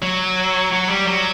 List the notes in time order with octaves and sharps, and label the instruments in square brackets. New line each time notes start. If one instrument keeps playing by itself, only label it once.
[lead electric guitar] F#3
F#3
G3
F#3